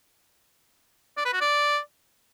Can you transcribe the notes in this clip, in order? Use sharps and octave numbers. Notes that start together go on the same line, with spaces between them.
D5
B4
F#4
D5